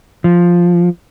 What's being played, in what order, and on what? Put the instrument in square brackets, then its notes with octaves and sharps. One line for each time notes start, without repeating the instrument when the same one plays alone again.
[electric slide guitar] F3